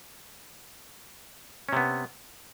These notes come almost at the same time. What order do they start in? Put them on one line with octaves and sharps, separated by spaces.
C#4 C3 B3